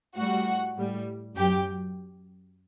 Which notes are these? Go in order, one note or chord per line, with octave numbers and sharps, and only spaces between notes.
A2 G3 F#4 F#5
A2 G3
F#2 F#3 G4 G5